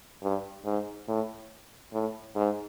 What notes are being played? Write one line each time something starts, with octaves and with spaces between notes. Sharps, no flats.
G2
G#2
A2
A2
G#2